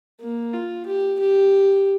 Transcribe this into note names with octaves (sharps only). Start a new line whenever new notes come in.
A#3
F4
G4
G4